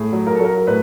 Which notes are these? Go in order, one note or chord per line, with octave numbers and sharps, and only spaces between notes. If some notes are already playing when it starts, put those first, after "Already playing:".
Already playing: A2 G#4
F#3
A#4
A4
F#3 A#4
A#4
A2 B4